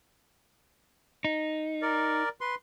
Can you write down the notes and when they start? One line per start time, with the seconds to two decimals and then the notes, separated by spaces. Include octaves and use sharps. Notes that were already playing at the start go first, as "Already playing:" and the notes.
1.25 D#4
1.82 A#4 D5
2.41 B4 C6